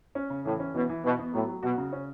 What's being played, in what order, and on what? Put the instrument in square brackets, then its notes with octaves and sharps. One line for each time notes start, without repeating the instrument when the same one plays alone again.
[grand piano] C#4
C#3
[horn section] A2 [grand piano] E3
[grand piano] C#4
[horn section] B2 [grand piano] E3
[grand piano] E3
[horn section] B2 [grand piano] E3
[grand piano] B3
[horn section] A2 [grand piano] F#3
[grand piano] F#3
[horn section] B2 [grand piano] F#4
[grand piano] C#3
C#4